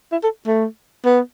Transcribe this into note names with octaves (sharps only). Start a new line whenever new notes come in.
E4
A4
A3
B3